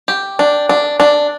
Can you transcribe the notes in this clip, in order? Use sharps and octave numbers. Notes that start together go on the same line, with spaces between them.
G4
D4
D4
D4